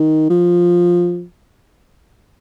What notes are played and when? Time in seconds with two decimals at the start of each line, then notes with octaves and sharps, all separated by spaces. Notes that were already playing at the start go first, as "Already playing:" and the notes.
Already playing: D#3
0.30 F3